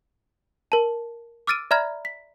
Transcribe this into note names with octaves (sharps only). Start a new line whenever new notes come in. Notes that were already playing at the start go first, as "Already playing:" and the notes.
A#4 A5
D6 E6 F6 A6 D7 D#7
D5 E5 A#5 B5 F6 G#6
B6